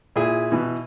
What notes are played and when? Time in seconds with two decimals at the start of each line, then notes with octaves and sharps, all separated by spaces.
0.16 A#2 E4 G#4
0.52 B2 E3